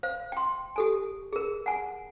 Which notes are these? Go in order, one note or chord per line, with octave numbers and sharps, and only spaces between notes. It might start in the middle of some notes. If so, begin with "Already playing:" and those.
C5 F5
G5 C6
G4 A4 G#5
G#4 A#4
F#5 G#5